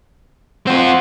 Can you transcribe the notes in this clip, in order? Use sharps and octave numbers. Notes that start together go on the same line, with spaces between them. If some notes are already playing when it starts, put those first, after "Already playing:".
C4 F4 F#5